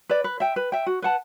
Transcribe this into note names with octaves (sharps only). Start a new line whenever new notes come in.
B4 D5
B4
E5 G5
B4
E5 G5
F#4
B4 F#5 A5